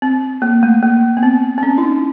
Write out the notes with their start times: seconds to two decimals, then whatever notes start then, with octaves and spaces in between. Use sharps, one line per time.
0.02 C4
0.42 A#3
0.63 A3
0.83 A#3
1.17 B3
1.23 C4
1.58 C4
1.63 C#4
1.78 E4
1.83 D#4